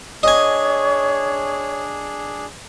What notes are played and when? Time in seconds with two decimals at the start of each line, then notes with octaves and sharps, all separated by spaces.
0.23 D4 G#4 C#5 D#5 G#5